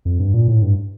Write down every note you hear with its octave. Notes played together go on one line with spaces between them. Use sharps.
F2
G2
A#2
A2
G2